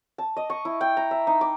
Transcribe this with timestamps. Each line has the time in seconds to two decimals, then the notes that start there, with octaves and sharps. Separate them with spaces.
0.18 A5
0.37 D#5
0.50 C#6
0.65 E4
0.81 G5
0.97 A#5
1.11 E5
1.27 D#4
1.41 D6